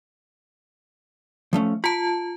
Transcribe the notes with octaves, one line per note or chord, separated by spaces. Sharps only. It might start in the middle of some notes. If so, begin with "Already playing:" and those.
F3 A3 C#4
F4 A5 B5